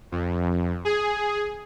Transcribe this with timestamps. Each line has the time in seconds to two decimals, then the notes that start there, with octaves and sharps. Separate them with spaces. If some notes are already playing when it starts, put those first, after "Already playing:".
0.12 F2
0.85 G#4